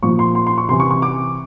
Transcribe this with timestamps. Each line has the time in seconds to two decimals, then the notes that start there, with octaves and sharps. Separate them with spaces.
0.02 A#2 F3 C#6
0.19 C6
0.35 C6
0.47 C6
0.58 C#6
0.68 C3 E3 C6
0.80 C#6
0.90 C#6
1.02 D6